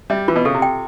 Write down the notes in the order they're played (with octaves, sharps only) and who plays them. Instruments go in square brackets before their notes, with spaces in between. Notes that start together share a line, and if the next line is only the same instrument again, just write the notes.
[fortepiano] G3 [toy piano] E5
[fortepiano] E3 [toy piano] F4
[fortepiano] B2
[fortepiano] C#3 [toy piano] A4
[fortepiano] C3
[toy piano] G5